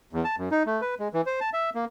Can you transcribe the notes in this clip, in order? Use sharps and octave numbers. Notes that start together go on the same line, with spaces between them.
E2
A5
F#2
D#4
A3
B4
G#3
E3
C5
A5
E5
A#3